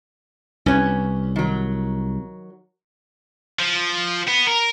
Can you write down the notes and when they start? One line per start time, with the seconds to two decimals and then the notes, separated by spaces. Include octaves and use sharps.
0.66 C2 C#4 B4 C#5
1.36 D#3 F#3
3.59 F3
4.28 B3
4.47 A#4